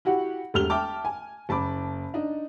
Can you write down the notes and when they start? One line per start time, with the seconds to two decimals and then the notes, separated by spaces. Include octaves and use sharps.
0.05 E4 F#4 G4 F#5
0.54 E1 A3 G4 F6 F7 G7
0.70 E5 G5 A5 D6
1.05 G#5
1.49 F#1 A5 B5 D6
2.14 D4 D#4